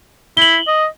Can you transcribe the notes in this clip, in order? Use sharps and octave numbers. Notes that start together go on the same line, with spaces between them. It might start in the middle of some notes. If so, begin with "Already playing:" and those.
E4 F#7 G7
D#5